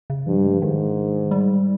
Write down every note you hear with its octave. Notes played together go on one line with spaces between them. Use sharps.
C#3
G2 F3
G3
G#3
F3
G#2 D#3
G3